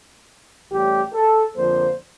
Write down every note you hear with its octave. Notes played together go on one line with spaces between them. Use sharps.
A1 A2 G3 G4
A4
F2 D3 F3 A#3 C5